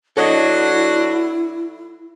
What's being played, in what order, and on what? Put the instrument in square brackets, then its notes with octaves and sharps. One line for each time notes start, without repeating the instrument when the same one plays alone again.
[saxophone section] F#3 B3 D4 [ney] E4 [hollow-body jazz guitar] A4 C#5 D#5